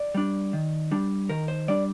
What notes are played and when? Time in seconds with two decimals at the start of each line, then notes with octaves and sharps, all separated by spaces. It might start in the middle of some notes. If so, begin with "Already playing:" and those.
Already playing: D5
0.14 G3 D4
0.53 D#3
0.91 G3 D4
1.29 D#3 A#4
1.48 C5
1.68 G3 D4 D5